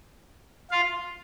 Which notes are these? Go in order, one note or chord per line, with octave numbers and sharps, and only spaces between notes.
F4 F5